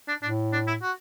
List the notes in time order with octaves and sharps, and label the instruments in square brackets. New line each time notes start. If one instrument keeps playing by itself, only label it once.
[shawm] D4
[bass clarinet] A2 [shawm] D4
[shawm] D4
E4
F#4